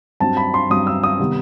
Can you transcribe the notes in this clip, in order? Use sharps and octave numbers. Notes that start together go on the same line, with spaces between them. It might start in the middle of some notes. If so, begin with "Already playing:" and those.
G2 F#3 C4 A5
B5
C6
G2 F#3 C4 D#6
E6
D#6
C3 D#3 G3 B3